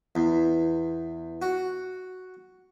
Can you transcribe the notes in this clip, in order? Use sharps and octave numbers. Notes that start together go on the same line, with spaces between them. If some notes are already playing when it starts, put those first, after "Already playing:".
E2
F#4